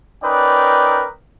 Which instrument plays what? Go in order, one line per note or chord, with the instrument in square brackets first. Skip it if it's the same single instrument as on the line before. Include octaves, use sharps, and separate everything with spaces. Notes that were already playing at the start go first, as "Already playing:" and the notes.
[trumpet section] C#4 D#4 A#4 B4 D5 G5